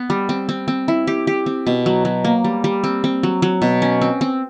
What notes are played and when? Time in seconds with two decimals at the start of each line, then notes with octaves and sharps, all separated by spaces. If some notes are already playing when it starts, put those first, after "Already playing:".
Already playing: B3
0.10 G3
0.29 C4
0.49 C4
0.68 C4
0.88 E4
1.07 G4
1.27 G4
1.46 C4
1.67 B2
1.86 F#3
2.05 F#3
2.25 A#3
2.44 G3
2.64 G3
2.84 C4
3.04 C4
3.23 F#3
3.42 F#3
3.62 B2
3.82 C#4
4.01 C4
4.21 C4